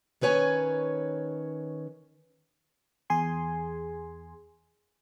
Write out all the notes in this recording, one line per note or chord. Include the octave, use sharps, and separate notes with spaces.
D#3 C#4 B4 C#5 G#5
E2 G#4 G#5 C6